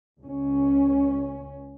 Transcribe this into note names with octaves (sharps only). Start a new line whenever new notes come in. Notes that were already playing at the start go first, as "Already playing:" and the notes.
C#2 C#4